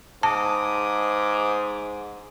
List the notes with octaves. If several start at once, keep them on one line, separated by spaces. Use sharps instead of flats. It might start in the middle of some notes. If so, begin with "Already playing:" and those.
G#2 A5 D6 D#6